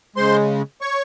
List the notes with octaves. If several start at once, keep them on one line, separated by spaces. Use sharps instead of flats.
C#3 G#3 C5 C6
C#5 C#6